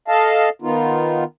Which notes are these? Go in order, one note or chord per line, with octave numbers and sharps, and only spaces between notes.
A4 D#5 F5 A5
D#3 B3 D#4 F4